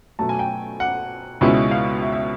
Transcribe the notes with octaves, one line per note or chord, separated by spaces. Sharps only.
B2 F#3 A3 A5
G#5
G5
F#5
C#2 B2 G#3 C#4 E4
F5
E5
E5